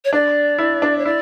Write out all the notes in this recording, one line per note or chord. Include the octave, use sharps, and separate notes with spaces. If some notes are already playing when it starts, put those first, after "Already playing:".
C#5
D4 D5
E4
D4
C#5
E4 D5